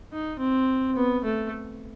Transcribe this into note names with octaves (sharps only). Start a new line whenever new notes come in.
D#4
C4
B3
A3